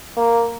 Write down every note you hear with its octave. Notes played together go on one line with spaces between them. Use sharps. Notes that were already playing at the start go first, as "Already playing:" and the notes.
A#3